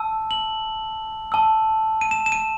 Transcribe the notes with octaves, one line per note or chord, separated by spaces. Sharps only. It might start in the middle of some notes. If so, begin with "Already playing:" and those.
Already playing: A5 E6
F#7
A5 E6
D#7
E7
E7
D#7